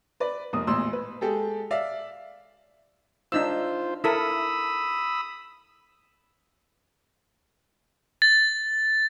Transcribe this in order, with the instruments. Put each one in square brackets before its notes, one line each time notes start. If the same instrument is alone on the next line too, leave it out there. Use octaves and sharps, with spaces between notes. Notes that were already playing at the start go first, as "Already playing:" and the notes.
[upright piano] B4 D5
F1 A#3 D#6
A1 E2 A#2 C6 E6
B4
G#3 G4 A4
D5 E5 F5
[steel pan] D4 D#4 E6 [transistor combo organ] F4 C5
[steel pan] E4 A4 A#4 [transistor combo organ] B5 D#6 E6
[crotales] A6